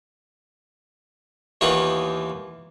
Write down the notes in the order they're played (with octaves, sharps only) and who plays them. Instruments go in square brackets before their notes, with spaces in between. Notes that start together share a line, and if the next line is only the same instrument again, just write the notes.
[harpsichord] D#2 D#3 E3 B3 F4 C#6